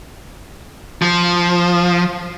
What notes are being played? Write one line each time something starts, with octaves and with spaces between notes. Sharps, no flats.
F3